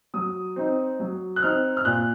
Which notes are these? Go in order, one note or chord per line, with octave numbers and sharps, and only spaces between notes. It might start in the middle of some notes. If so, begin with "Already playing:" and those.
F#3 D#6
C4 D#4
F#3
F#6
C4 D#4 F6
F6
A#2 F#6